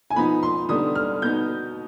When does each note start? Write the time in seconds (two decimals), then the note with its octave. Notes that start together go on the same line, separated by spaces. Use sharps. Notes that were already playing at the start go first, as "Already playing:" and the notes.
0.10 G#5
0.16 F3 B3 D#4 B5
0.43 C6
0.69 D3 G3 B3 D#4 D#6
0.95 F6
1.22 B2 B3 D#4 G6